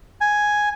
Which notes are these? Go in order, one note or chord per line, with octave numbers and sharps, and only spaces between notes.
G#5